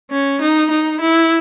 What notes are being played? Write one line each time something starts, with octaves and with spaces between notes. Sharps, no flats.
C#4
D#4
D#4
E4